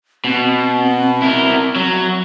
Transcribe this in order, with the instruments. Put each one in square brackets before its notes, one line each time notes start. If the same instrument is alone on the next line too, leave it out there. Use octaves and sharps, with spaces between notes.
[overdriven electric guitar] B2 [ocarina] C4
[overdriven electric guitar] E4 A#4
F#3